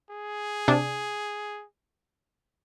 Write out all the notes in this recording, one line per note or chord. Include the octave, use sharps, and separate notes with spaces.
G#4
C3 D4